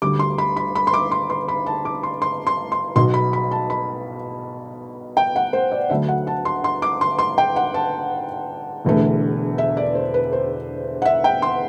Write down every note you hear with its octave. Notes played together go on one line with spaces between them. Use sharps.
D2 D3 G3 D6
C6
B5
B5
B5
C6
D6
C6
C6
B5
A5
D6
C6
C6
C6
C6
B1 B2 F#3 C6
B5
B5
A5
B5
G5
F#5
C5
D5
D2 D3 F#3 A3 E5
F#5
A5
C6
C6
D6
C6
C6
G5
F#5
A5
E1 E2 D3 A3
E5
D5
C5
B4
C5
F#5
E5
G5
C6